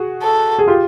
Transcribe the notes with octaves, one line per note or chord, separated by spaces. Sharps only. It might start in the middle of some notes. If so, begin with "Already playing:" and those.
Already playing: F#4 G#4
A4
G#4
F4 G4